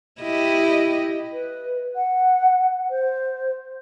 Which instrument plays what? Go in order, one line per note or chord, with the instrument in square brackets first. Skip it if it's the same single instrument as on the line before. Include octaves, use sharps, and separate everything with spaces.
[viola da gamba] E4 G4 D#5
[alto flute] B4
F#5
C5